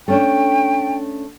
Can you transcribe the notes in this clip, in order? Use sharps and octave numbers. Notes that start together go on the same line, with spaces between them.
A3 C#4 D4 G5